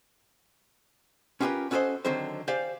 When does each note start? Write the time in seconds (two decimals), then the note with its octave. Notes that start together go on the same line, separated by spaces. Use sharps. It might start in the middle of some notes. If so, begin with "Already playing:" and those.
1.40 C#4 F4 G4 G#4 A#4 B4
1.71 C#4 F#4 A4 B4 C5 D#5
2.05 D3 D#3 F#3 C4 C5
2.48 G4 C5 D5 F5 G#5